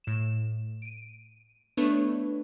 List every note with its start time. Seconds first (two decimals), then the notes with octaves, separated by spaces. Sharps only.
0.04 A2 E7
0.82 D7 D#7
1.77 A3 B3 D4 E4 B4 C#5